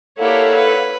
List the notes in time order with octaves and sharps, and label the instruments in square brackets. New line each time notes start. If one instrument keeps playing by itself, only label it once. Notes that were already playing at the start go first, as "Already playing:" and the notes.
[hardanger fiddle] A#3 G4 [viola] E4 C#5 [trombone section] A4 [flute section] D5 F5 F#5
[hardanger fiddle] B4